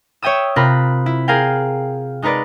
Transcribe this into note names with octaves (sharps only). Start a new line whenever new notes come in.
C#5 E5 G5 D#6 E6
C3 C4 F4 A#4 B5 F#6
E4
G#4 A#4 F5 G5
G#3 D#4 A#4 B4 D5